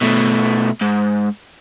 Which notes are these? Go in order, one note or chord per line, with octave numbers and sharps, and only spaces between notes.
B2 A3
G#2